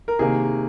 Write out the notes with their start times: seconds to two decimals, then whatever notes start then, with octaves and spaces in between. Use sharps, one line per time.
0.08 A#4
0.19 C3 D#3 A#3 G#4